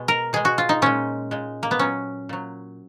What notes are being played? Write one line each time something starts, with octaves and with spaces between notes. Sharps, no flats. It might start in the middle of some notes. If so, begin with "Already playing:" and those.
Already playing: B2 G#3
A#4
B2 G#3 G#4
F#4
F4
D#4
A#2 G#3 C#4
A#2 G#3
A#3
B3
A#2 F#3 C#4
A#2 F#3